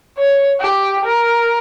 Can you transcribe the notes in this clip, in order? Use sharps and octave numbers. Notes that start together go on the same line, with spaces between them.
C#5
G4
A#4